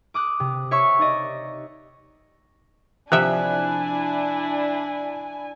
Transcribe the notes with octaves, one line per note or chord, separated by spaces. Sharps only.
D6 D#6 F#6
C3
C#5 E5 C#6
D#4 D5 D#5
C3 F3 D4 E4 E5 G#5 F#6